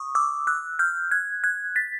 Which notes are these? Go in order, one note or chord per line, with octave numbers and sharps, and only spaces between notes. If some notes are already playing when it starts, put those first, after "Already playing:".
Already playing: C#6 D#6
D6 E6
E6 F#6
F6 G6
F#6 G#6
F#6 G#6
A6 B6